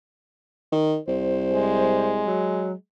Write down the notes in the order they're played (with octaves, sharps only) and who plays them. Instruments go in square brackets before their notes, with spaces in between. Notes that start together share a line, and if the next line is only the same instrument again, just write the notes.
[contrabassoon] D#3
[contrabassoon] C2 [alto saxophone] C5
[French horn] G#3
[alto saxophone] F#3